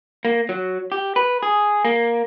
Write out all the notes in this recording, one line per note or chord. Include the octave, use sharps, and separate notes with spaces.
A#3
F#3
G4
B4
G#4
A#3